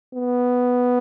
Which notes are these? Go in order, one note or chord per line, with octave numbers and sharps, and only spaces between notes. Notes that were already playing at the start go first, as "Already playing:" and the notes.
B3